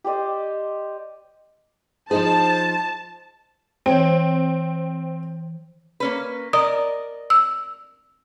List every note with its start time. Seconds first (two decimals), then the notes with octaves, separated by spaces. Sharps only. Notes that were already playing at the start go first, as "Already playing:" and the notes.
0.04 G4 C5 D5 D#5
2.11 F3 D#4 G#4 C5 A5
3.86 E3 C4 C#5 G5
6.00 A#3 C#4 B4
6.53 A#4 D5 D#5 D#6
7.30 E6